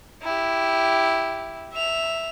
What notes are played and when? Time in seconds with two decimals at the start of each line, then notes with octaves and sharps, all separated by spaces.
0.23 E4 G4
1.72 E5 F7